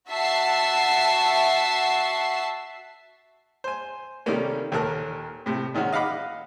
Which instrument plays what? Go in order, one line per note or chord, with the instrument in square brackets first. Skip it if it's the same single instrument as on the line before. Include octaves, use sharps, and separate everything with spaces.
[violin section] F#4 E5 A5 E6 C7
[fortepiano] C5 G#5
C3 D#3 G3 A3 A#3 C#4
D#2 A#2 A4 A#4 F#6
A2 C3
A#2 D#3 G#3 C#4 F#4
D#5 F5 F#5 B5 D6